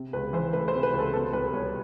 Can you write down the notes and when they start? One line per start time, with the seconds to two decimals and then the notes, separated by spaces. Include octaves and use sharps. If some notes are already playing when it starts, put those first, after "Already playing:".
Already playing: C3
0.13 C#2 B4
0.33 E3 C5
0.53 A3 B4
0.68 C5
0.74 C3
0.83 B4
0.94 C#2 A4
1.13 B2 A4
1.33 C2 B4
1.54 G3 C#5